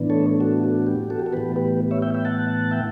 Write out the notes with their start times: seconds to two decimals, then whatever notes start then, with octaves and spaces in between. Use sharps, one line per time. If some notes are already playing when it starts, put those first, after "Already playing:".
Already playing: A2 E3 B3 D4
0.10 A4 C#5
0.40 F#4 A4
0.64 F#4
0.87 G4
1.10 F#4 A4
1.19 G4
1.26 A4
1.33 A2 E3 B3 G4 B4
1.56 G4 B4
1.91 C#5 E5
2.02 E5 G5
2.14 E5 G5
2.25 F#5 A5
2.71 E5 G5